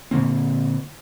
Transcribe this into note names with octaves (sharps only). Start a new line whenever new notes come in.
A#2 D3 A#3 C4